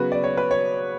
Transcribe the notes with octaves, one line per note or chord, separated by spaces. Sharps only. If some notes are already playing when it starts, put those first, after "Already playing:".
Already playing: C#3 F#3 B3 F#4 B4
D5
C#5
B4
C#5